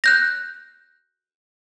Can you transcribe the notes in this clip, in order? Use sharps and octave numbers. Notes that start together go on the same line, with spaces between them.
F#6 G6 A#6